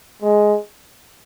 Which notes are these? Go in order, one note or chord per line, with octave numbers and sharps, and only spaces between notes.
G#3